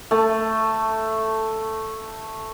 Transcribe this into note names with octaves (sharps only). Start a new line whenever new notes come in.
A3 A5